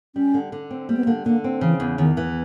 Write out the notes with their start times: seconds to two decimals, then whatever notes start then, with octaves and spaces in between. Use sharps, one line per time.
0.16 G3 C#4
0.34 D3
0.52 D3
0.71 C4
0.89 G3 A#3
0.97 B3
1.04 A#3
1.07 D3
1.25 D3 A#3
1.44 C4
1.61 C#3 E3
1.80 E2
1.98 E2 D#3
2.17 E3